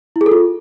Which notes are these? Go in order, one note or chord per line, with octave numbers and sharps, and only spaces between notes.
E4
G#4
A4
F4